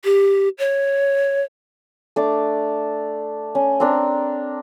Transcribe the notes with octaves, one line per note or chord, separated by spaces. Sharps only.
G4
C#5
A3 D4 D6
C#4
C4 D4 A#4